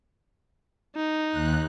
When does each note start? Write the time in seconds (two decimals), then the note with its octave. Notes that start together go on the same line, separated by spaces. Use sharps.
0.96 D#4
1.29 D#2 F#6